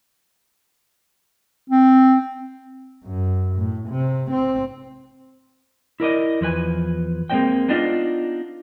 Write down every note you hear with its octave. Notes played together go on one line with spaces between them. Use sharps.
C4
F#2
A2
C3
C4
E4 A#4 D5 D#5
E2 F3 B4 G#5
G#3 A#3 C4 C5 D#5 G5
B3 D4 D#4 F4 D5 D#5